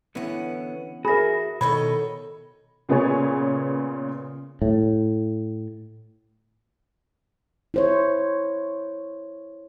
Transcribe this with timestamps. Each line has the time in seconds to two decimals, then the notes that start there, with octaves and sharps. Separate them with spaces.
0.15 D3 E3 B3 C#4 F#5
1.05 F#4 G#4 A#4 E5 B5 A#6
1.61 B2 D#3 A4 C5 C#5 D#5 B5
2.89 A#2 C#3 B3 G#4 C#5 G#5
4.62 A2
7.74 E4 C5 C#5